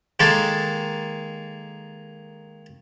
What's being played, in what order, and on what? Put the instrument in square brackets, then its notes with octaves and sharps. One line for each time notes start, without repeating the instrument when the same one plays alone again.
[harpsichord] D#3 G#3 A#3 A4